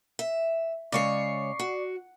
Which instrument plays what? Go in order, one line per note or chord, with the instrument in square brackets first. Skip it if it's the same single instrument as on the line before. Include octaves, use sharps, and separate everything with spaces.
[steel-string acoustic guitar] E5
[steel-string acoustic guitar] C#3 G#3 C#5 [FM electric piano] D5 C#6 C7
[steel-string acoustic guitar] F#4